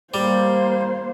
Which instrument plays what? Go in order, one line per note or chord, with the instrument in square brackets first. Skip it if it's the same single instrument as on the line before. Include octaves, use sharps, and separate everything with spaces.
[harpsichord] G3 [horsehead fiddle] A#3 C5